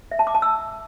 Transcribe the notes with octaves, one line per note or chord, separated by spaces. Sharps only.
E5
A5
D6
A5
E6